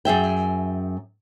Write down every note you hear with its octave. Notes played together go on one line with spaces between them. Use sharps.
F#2 G#4 E5 G5